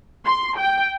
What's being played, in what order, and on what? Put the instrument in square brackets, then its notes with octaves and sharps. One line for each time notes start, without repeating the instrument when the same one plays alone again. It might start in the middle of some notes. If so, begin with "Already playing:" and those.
[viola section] C6
G5